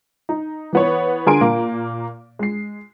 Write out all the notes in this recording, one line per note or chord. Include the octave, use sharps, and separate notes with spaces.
D#4
E3 B3 C#5
D3 G#4 A#4 G#5 C6 D7
A#2 A#3
G#3 C7